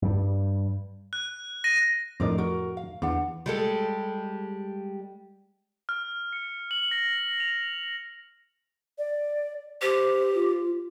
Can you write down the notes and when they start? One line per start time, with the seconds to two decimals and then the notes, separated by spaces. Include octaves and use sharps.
0.02 G2 G3
1.13 F#6
1.64 A#6 D#7
2.20 F2 A2 D4 A#4 D5 D#5
2.38 F#4 A#4
2.77 F5
3.02 E2 D4 F#5
3.46 G3 G#3 A4
5.89 F6
6.33 C#7
6.71 F#7
6.91 A#6
7.40 F7
8.98 D5
9.82 G4 C5
10.35 F4